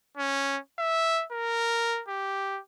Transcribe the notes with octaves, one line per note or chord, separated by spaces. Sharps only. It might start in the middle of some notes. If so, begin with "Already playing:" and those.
C#4
E5
A#4
G4